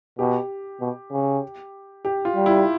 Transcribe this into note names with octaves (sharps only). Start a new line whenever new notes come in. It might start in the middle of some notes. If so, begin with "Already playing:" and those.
B2 G4
B2
C#3
G4
F4
G3
E4